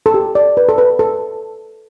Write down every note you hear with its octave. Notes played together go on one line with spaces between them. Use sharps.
A4
G4
D5
B4
A4
B4
A4